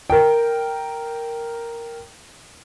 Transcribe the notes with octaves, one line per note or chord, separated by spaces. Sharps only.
A#4 G5